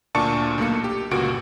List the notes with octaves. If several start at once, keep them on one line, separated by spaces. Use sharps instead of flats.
D2 A#2 D4 A5 C#6 C#7
B1 A3 A#3 C#7
G4
G1 C#2 A#2 F#4 D7